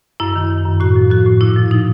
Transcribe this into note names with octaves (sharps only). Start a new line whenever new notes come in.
F#2 E4
D#3
D#3
F#2
A2 F#4
F3
F3 F#4
A2
A#2 E4
F3
F3 D#4